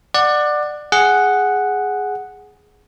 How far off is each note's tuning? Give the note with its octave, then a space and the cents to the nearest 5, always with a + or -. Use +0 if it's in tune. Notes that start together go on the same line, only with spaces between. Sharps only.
D5 +20 F#5 -5
G#4 +0 F#5 +0